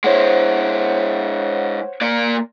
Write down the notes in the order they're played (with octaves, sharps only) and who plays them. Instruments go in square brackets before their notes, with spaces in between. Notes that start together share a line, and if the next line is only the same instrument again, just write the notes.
[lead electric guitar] G#3 E4 [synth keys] C5 C#5 F#5
[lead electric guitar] A#3 D5